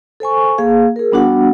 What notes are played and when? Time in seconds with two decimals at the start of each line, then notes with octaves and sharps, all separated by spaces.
0.20 A4 C5 G#5 C#6
0.58 A#3 G#4 F5
0.96 G#4 A#4
1.12 G3 B3 D4 F#4 F#5